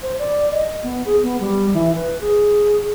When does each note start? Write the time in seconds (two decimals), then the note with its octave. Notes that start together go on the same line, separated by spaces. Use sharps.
0.02 C5
0.19 D5
0.51 D#5
0.83 B3
1.06 G#4
1.22 B3
1.40 G3
1.74 E3
1.95 B4
2.21 G#4